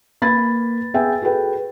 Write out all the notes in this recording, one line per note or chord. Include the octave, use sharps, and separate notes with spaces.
A#3 B4 B5 G#6 A6
B3 G#4 E5 G5 G#5
F#4 G#4 A4 B4 G5